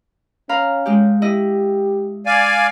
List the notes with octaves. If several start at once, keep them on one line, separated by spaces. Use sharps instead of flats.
C#4 F5 A#5 B5
G#3 G4
E4 G4 D#5
D5 F5 G#5